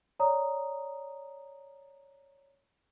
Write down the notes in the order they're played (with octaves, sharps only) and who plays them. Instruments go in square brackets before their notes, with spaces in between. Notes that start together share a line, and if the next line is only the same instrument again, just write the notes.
[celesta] C#5 D5 A#5 D#6